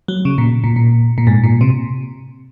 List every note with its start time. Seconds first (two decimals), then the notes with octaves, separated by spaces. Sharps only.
0.08 F#3
0.25 C#3
0.38 A#2
0.64 A#2
0.76 A#2
1.18 A#2
1.27 G#2
1.44 A#2
1.61 C3